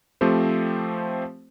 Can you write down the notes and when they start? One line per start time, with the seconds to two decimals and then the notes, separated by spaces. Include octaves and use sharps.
0.21 F3 A3 C4 G4 C5